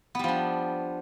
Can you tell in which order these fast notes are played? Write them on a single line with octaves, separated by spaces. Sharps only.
B3 G3 F3 D4